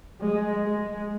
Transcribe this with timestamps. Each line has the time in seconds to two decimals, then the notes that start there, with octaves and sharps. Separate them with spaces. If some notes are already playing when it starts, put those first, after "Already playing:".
0.21 G#3
0.65 G#3